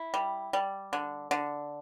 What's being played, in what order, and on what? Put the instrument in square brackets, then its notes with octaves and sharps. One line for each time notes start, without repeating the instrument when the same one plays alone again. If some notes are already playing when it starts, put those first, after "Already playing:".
Already playing: [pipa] E4
G3
G3
D3
D3